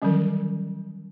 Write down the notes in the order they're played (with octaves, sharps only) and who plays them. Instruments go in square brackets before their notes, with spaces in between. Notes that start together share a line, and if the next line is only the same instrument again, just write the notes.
[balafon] D#3 E3 F#3 G3 C#4